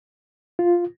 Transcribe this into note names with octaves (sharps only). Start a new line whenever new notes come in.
F4